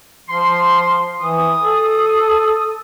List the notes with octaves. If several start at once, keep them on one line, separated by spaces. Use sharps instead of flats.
F3 C6
E3 D#6
A4